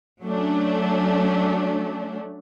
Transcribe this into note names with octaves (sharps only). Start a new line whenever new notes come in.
F#3 A3 C#4 D4